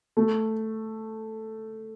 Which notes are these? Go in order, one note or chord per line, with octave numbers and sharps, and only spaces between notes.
A3